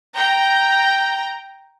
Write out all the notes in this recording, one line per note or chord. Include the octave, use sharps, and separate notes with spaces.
G5 A#5